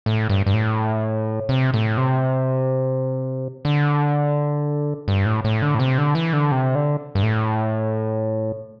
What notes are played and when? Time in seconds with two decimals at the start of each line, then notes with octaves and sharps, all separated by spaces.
0.06 A2
0.30 G2
0.46 G2
0.54 A2
1.49 C3
1.74 A2
1.97 C3
3.65 D3
5.08 G2
5.26 A2
5.44 A2
5.62 D3
5.75 A2
5.79 C3
5.98 D3
6.15 E3
6.33 D3
6.51 C3
6.75 D3
7.15 G2
7.23 A2